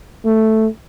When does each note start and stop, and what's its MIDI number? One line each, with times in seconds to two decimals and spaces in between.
0.25 0.67 57